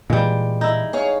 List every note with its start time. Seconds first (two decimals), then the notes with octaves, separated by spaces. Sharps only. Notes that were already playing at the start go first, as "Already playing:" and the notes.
0.10 A#2 E3 G3 G#3
0.61 D#4 E4
0.93 G#4 C#5 F5